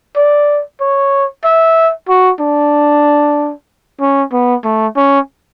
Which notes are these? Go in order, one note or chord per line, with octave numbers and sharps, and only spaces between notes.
D5
C#5
E5
F#4
D4
C#4
B3
A3
C#4